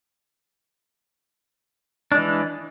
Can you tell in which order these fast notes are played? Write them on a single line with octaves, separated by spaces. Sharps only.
D4 G#3 E3